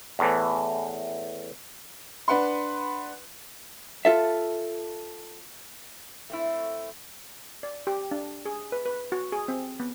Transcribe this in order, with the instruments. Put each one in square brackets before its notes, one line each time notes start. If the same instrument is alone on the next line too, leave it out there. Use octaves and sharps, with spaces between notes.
[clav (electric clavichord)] E2 A2 E3
[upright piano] D4 B4 F#5 C6
[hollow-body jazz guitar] F4 A4 E5
[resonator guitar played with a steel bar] A3 C4 E4
[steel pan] D5
G4
D4
G#4
B4
B4
F#4
G#4
C4
B3